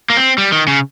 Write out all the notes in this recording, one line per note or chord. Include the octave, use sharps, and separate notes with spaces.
A#3
C4
G3
D#3
C#3